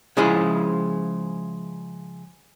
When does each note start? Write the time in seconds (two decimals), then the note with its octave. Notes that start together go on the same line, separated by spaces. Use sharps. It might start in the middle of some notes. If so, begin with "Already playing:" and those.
0.17 C#3 F3 G#3 E4 G#4